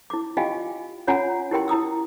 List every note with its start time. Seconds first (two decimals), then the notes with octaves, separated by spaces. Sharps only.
0.10 E4 D6
0.37 F4 G4 D#5 F5 G5 G#5
1.07 C#4 F4 C#5 F#5 G#5 A#5
1.51 E4 G4 A#4 G5 C6
1.68 E4 A#5 D#6 E6